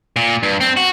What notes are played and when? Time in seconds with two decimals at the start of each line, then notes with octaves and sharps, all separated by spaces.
0.16 A#2
0.43 G2
0.61 C4
0.77 F#4